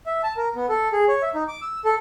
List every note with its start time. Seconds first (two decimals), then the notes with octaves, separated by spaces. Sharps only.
0.06 E5
0.23 A5
0.37 A#4
0.55 B3
0.69 A4
0.93 G#4
1.08 C#5
1.22 E5
1.35 D#4
1.48 D6
1.62 E6
1.85 A4